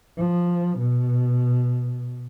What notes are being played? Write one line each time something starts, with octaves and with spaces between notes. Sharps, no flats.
F3
B2